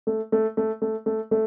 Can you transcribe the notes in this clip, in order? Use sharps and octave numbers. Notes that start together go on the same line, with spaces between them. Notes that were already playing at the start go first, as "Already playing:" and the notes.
A3
A3
A3
A3
A3
A3